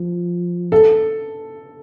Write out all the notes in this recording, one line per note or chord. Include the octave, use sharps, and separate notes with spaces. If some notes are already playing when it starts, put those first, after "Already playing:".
Already playing: F3
A4